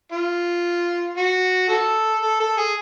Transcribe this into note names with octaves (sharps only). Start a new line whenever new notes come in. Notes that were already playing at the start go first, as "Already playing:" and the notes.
F4
F#4
F#4 A4
A4
A4
G#4